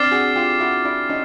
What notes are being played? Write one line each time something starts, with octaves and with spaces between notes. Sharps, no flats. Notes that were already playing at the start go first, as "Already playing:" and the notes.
Already playing: C4 D4 D6 F6 A6 C7
F#4 G#4
F4 G4
E4 F#4
D4 E4
C#4 D#4